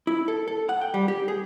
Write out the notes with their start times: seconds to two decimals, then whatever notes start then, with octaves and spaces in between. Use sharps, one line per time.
0.07 E4
0.28 A4
0.48 A4
0.69 F#5
0.81 G5
0.94 G3
1.08 G4
1.28 G#4